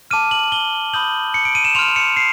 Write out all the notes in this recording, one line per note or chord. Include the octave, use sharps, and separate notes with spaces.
A5 D6 F6 D#7
F#7
G7
B5 D#6 G6 F#7
C#7
D7
D#7
E7
C6 F6 F7
C#7
C7